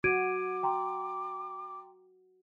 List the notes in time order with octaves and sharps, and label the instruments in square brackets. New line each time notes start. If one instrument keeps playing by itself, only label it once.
[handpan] F#4 [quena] D6 [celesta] G#6 D7 D#7
[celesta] G5 A#5 C6